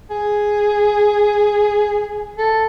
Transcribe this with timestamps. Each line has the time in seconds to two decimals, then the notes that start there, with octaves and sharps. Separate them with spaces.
0.10 G#4
2.38 A4